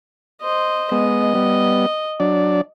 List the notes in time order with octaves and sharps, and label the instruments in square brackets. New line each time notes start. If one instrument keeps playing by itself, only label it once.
[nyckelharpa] C5 D#5
[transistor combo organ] G#3 B3 [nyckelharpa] D#5
[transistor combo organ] G3 B3
F#3 D4 D5